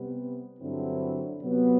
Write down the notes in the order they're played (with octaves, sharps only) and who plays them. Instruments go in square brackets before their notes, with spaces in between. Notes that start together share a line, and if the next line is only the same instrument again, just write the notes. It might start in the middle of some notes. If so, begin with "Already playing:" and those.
Already playing: [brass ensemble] C3 G3 B3
G2 D3 F#3 C4 E4
C3 F#3 B3